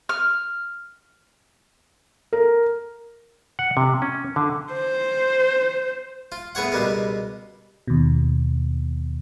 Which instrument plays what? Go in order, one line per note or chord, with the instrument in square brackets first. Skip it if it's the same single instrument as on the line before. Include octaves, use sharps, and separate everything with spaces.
[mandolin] F6
[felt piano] A#4
[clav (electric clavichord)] F#5
C3
C#4
D3
[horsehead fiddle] C5
[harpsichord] F4
A2 B3 G#4 C#5 F#5
C#2 B2 G3 B3 A#4
[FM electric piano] D#2 B2